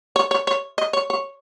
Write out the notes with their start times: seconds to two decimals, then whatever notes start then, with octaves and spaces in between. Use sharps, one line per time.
0.16 C#5
0.31 C#5
0.47 C#5
0.78 D#5
0.93 C#5
1.10 C#5